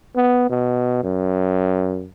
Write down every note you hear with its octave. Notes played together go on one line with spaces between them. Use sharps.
B3
B2
F#2